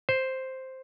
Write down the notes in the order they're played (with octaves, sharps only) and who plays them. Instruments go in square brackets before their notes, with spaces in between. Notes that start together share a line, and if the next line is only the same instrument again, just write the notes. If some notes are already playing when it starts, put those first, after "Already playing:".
[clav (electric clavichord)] C5